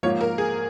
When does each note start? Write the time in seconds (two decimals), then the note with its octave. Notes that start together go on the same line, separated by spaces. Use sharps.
0.03 G#2 F3 A#3 F4 C#5
0.21 A#4
0.38 G#4